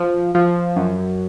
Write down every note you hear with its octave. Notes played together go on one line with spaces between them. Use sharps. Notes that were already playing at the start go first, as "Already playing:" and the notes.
Already playing: F3
F3
F#2